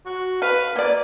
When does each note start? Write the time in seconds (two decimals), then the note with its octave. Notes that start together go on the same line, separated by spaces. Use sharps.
0.06 F#4
0.42 B4 F5
0.76 F#3 A#3 D5